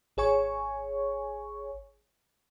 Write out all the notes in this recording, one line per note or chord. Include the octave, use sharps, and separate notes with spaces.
G#1 G#4 C#5 G#5 C#6